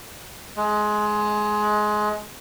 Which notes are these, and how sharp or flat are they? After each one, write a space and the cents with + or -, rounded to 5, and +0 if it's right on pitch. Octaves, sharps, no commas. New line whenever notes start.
G#3 +20